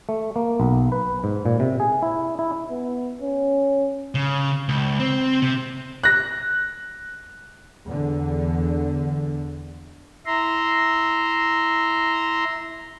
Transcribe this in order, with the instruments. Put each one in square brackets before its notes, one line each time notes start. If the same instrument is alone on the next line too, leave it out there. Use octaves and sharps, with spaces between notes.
[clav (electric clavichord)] A3
A#3
B1
B4
G#2
A#2
C3
G#4
E4
E4
[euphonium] B3
C#4
[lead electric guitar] C#3
C#2
C4
C3
[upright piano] F#6 A#6
[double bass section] E2 D3
[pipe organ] E4 E5 A#5 C6